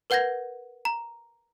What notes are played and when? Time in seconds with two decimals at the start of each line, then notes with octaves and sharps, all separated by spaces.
0.10 A#4 B4 F#5 G6 G#6 A#6
0.85 A#5